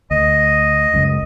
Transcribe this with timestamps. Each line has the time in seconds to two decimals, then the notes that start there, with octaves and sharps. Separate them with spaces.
0.11 D2 D#5
0.94 F#1 C#2 F#2